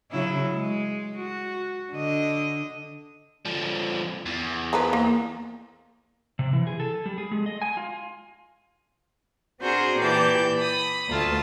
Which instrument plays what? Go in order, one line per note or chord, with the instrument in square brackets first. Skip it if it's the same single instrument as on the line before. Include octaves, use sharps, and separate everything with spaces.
[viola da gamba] C#3 F#3 E4
G#3
F#4
D3 D#5
[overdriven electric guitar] D3 F3
E2
[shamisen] F3 A#4 B4
A#3
[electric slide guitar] C3
E3
G#4
A4
G3
G#4
G#3
D#5
G#5
F4
[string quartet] C4 D4 F#4 G#4 A#4 C5
A#2 E3 G4 D5 A5 G6
B5 D#6
D2 A3 F4 A5